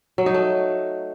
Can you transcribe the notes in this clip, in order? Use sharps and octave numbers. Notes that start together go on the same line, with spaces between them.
F#3
D#4
A3